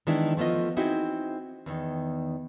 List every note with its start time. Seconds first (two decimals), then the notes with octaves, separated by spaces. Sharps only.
0.07 D#3 E3 G#3 B3 D4 E4
0.37 F3 A3 B3 F4 D#5
0.77 C4 D#4 E4 F#4 G#4
1.66 E2 D#3